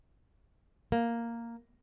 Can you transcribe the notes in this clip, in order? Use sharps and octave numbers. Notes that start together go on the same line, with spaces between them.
A#3